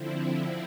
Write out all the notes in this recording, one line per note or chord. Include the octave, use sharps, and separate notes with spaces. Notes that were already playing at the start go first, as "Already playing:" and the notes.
Already playing: D3 F3 C4 E4